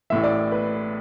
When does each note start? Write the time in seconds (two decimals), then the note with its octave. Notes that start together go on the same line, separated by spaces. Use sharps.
0.10 A1 A2 E3 E5
0.24 D5
0.52 B4